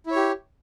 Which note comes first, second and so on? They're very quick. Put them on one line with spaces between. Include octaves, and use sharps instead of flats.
E4 C#5 G4